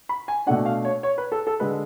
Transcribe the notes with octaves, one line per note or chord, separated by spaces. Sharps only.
B5
G#5
B2 A3 D4 F#5
F5
C#5
C#5
B4
A4
A4
D3 G#3 B4